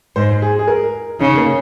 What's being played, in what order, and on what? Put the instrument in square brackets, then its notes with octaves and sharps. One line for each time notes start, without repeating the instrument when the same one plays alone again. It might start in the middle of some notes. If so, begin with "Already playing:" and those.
[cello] G#2 [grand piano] C5
[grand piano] G#4
G#4
A#4
[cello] C#3 [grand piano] D#4
[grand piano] A#3